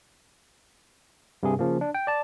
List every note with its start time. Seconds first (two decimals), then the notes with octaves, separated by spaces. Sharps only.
1.43 G2 C3 G#4
1.59 C#3 F3 A#3
1.81 D4
1.95 G5
2.07 D5 A5